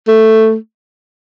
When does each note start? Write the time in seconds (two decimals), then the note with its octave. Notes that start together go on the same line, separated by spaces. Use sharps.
0.07 A3